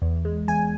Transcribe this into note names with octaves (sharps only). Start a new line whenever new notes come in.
E2
G#3
E2 G#5